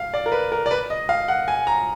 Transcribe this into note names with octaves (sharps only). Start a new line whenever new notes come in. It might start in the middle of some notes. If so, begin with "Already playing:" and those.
Already playing: F5
D5
A#4
B4
A#4
D5
B4
D#5
F5
F#5
G#5
A#5